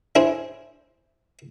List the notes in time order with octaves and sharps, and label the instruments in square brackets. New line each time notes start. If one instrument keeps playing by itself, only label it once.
[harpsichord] D4 E4 G#4 C5 C#5